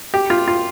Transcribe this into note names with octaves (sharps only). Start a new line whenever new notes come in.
G4
F4
F4